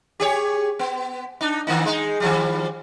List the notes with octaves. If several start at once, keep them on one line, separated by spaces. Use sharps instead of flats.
G4 G#4 C#5
B3
D4 D#4
D#3 A#3 D#4
G#3 D#4
D#3 F3 G3